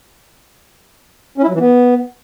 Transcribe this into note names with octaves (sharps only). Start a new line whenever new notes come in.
C#4
E4
F#3
E3
B3